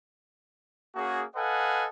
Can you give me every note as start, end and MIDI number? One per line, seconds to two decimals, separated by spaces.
0.96 1.23 58
0.96 1.23 61
0.96 1.23 66
0.96 1.23 68
1.36 1.87 69
1.36 1.87 71
1.36 1.87 75
1.36 1.87 77
1.36 1.87 78
1.36 1.87 80